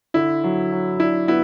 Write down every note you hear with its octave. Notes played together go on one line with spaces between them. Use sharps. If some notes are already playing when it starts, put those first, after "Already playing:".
D3 E4
F#3
F#3
D4 E4
B3 E4